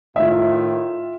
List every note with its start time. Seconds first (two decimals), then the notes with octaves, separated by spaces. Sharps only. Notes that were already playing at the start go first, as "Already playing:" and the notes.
0.16 A2 D#3 F4 E5